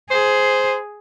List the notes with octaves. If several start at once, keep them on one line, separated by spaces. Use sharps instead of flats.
G#4 C5